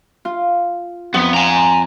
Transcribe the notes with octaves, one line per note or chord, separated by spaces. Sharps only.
F4
F2 B3
G#5 A#5